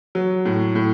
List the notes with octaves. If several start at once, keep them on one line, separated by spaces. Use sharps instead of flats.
F#3
A2
A2